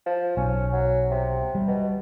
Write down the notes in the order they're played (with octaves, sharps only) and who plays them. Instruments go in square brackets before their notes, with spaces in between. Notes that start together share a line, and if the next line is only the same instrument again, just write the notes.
[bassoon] F3
[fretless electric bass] B1 [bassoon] C#4
[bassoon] F#3
C3
[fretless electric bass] G3
[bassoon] B2